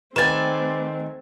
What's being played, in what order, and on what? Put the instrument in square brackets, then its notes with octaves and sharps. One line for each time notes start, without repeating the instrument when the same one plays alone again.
[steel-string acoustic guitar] D#3 G#5 [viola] A3 C4 [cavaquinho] B4 D5 [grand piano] A6 E7